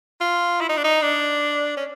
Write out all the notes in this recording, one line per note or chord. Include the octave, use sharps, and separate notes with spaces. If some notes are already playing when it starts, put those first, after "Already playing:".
F4
E4
D#4
D4
D#4
D4
C#4